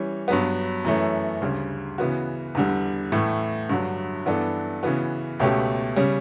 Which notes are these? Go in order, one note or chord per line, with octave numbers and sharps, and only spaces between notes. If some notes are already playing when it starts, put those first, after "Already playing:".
Already playing: E3 G3 C#4
G2 F#3 B3
F#2 E3 A3 C#4
D2 C#3 G3
C#3 E3 B3 F#4
E2 D3 G3
A2 E3 A3
G2 D3 F#3
G2 E3 B3 D4 A4
C#3 E3 B3 F#4
C#2 B2 A3 C#4 G4
C#3 G3 C#4